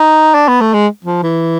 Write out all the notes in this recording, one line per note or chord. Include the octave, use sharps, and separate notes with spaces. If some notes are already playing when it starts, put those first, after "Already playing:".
Already playing: D#4
D4
B3
A3
G#3
F3
E3